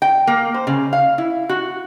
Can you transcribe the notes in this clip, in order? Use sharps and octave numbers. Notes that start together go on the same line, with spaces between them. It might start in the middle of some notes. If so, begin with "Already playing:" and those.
G5
A#3
C5
C#3
F5
E4
F#4